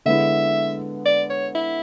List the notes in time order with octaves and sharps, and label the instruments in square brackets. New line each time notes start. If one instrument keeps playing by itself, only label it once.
[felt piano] D3 G#3 B3 E4 [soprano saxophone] E5
[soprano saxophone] D5
C#5
E4